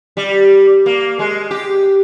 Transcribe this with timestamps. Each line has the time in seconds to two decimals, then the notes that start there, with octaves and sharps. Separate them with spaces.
0.17 G3
0.86 A#3
1.19 G#3
1.51 G4